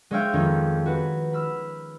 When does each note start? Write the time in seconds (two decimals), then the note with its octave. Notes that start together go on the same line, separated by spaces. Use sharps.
0.11 G#3 C5 C#5 E5 F5 G5
0.33 F2 D#3 C#4 D#4
0.86 F#4 B4
1.33 B5 E6 F6